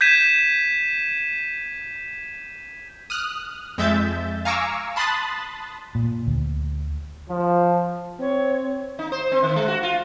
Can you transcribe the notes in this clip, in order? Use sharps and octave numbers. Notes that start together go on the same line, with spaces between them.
G6 G#6 B6 D#7 E7
D#6 F6 F#6
F2 G#3 E5 G6 A6
F5 G#5 A#5 C#6 D6 E6
A5 B5 C6 D#6 F#6 A6
A#2
D2
F3
C4 C#5
D#4
C5
C4
D#3
G#3
F#4
F4